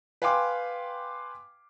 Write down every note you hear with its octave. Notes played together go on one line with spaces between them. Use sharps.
B4 F5 G5 G#5 C6 D6